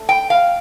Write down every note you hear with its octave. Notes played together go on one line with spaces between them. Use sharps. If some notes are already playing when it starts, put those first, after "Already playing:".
Already playing: D3 A3
G5
F5